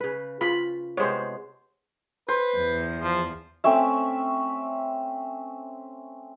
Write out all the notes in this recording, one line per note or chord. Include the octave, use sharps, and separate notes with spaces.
C#3 B4
C#3 F4 B5
C3 G#3 B3 C5 C#5
B4 C5
E2
F3
A3 C4 C#4 E5